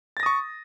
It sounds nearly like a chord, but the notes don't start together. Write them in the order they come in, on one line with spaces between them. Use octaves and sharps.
A6 A#6 D#6 C#6